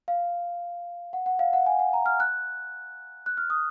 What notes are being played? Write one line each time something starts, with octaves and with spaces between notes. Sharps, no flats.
F5
F#5
F#5
F5
F#5
G#5
F#5
A#5
F6
F#6
F#6
F6
D#6